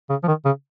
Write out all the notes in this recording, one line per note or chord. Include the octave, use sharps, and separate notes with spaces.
C#3
F3
D#3
C#3